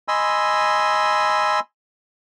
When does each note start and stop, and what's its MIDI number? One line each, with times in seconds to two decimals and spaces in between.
0.08 1.60 75
0.08 1.60 80
0.08 1.60 83
0.08 1.60 84
0.08 1.60 88